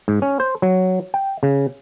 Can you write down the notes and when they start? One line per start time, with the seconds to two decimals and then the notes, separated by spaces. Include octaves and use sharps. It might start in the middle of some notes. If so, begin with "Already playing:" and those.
0.08 G#2
0.22 C#4
0.40 C5
0.62 F#3
1.14 G5
1.43 C#3